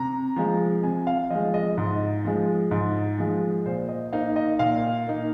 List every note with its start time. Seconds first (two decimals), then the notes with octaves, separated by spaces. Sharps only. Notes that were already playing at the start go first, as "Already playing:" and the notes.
Already playing: C3 A#5
0.36 F3 G#3
0.84 C3 G#5
1.07 F5
1.30 F3 G#3 D#5
1.54 D#5
1.78 G#2
2.24 F3 G#3
2.71 G#2
3.19 F3 G#3
3.66 A#2 C5
3.89 D#5
4.13 A#3 D#4 F5
4.36 D#5
4.59 A#2 F5
5.07 A#3 D#4